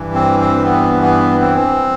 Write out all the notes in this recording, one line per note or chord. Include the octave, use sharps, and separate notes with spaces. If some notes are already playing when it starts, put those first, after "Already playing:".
Already playing: G2 E3
C4
C4
B3
B3
C4